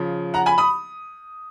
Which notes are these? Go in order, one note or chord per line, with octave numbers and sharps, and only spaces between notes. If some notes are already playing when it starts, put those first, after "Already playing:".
Already playing: C#3 F3
F#5 A#5
G#5 B5
B5 D#6